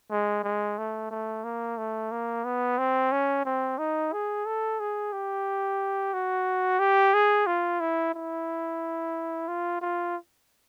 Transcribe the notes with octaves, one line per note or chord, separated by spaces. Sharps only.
G#3
G#3
A3
A3
A#3
A3
A#3
B3
C4
C#4
C4
D#4
G#4
A4
G#4
G4
F#4
G4
G#4
F4
E4
E4
F4
F4